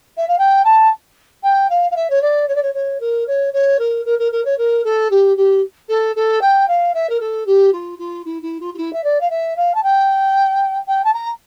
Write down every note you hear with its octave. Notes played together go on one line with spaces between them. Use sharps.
E5
F5
G5
A5
G5
F5
F5
E5
C#5
D5
C#5
D5
C#5
C#5
A#4
C#5
C#5
A#4
A#4
A#4
A#4
C#5
A#4
A4
G4
G4
A4
A4
G5
F5
E5
A#4
A4
G4
F4
F4
E4
E4
F4
F4
E4
E5
D5
F5
E5
F5
A5
G5
G5
A5
A#5